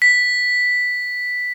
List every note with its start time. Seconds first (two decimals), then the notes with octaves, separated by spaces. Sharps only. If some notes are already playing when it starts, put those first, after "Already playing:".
0.02 B6